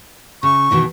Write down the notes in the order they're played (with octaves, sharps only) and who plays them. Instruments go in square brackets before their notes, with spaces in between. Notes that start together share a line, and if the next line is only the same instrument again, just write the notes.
[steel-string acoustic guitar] C#3 [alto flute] C#6
[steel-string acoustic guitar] B2 D#3 E3